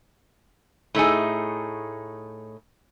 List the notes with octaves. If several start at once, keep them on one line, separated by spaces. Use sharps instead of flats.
A2 A3 D#4 G#4